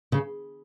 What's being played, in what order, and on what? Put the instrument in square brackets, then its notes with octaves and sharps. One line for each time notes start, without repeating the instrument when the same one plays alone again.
[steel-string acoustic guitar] C#3